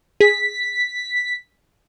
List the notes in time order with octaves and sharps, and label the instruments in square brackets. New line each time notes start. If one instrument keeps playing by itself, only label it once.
[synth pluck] G#4 [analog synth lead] B6